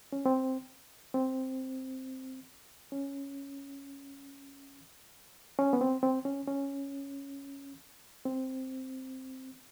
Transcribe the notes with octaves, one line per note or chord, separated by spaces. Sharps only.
C#4
C4
C4
C#4
C#4
B3
C4
C4
C#4
C#4
C4